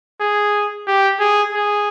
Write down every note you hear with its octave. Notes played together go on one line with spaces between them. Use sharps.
G#4
G4
G#4
G#4